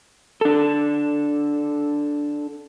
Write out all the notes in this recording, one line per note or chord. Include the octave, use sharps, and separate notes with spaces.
D4 A4